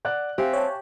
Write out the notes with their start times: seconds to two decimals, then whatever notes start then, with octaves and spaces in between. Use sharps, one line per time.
0.05 D5 F#5 F#6
0.38 C4 G4 E5 F5 G#5
0.53 C#5 G5 A5